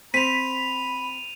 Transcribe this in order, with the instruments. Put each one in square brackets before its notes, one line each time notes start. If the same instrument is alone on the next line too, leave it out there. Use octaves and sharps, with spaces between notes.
[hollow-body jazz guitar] C4 [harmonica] B5 [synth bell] B6 [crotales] D#7 F7